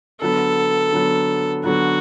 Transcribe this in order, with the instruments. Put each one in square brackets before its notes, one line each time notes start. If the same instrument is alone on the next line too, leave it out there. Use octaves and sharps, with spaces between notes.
[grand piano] D3 F#3 B3 [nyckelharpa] A4
[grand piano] D3 F#3 B3
[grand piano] D3 F#3 B3 [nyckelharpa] F#4